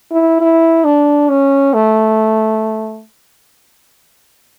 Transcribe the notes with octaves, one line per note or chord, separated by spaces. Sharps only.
E4
E4
D4
C#4
A3